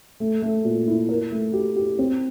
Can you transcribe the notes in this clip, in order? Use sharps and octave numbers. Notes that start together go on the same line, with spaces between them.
A3
A3
A#2
E4
A#4
A3
G4
G4
C4